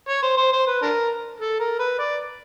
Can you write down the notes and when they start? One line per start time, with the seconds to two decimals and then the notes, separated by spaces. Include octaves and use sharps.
0.09 C#5
0.22 C5
0.37 C5
0.53 C5
0.67 B4
0.82 D4 A#4
1.40 A4
1.60 A#4
1.79 B4
1.99 D5